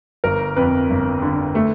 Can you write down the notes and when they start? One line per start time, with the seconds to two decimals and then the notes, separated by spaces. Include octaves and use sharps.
0.24 G1 A#4
0.56 F2 B4
0.90 G1
1.22 D3
1.55 A3